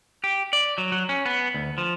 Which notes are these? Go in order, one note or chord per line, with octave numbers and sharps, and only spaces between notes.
G4
D5
F#3
F#3
C#4
B3
D2
F3